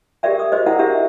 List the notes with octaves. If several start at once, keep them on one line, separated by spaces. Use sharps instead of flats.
G4 G#4 A#4 D5 E5 G5
D#6
F#4 G#4 C5 D#5
E4 A#4 E5 F#5 G5
D4 G4 G#4 A#4 E5